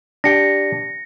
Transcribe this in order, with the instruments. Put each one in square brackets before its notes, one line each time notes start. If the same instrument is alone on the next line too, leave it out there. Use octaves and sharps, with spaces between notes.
[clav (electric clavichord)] D4 G4 G5 [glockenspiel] A#6 C#7